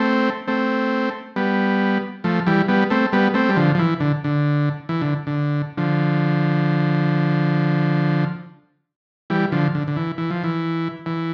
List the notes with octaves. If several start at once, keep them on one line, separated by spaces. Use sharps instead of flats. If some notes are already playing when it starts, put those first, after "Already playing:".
Already playing: A3 C4
A3 C4
G3 B3
F3 A3
E3 G3
G3 B3
A3 C4
G3 B3
A3 C4
G3
D3 F3
F3
E3
D3
D3
E3
D3
D3
D3 F3
E3 G3
D3 F3
D3
D3
E3
E3
F3
E3
E3